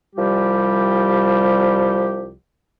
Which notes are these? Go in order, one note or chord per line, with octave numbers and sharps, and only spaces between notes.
C2 F3 G3 G4